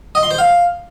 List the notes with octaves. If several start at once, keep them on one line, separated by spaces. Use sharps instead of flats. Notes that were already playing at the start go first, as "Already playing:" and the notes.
D#5
C6
C5
F5